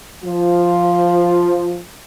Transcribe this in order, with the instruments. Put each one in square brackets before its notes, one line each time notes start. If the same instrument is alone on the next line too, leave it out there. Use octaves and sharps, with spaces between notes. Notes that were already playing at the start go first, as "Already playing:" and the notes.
[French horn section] F3 F4